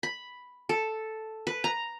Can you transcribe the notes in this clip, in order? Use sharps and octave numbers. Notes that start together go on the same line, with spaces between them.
B5
A4
B4
A#5